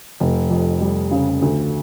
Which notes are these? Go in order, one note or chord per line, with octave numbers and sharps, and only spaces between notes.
F1
F2
G3
C#3
D2